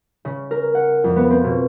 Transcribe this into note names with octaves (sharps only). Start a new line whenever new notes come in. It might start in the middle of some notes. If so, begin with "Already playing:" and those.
C#3
A#4
F#5
F2
B3
C4
B2